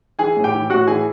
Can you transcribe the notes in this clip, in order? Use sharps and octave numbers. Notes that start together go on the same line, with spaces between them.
E3 G#4 G#5
A2
G4 G5
E3
A2 F#4 F#5
E3 G#4 G#5